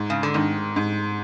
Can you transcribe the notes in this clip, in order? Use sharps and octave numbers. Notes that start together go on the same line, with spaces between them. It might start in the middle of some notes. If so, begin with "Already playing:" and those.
Already playing: G#2
C#3
D3
G#2 D#3
G#2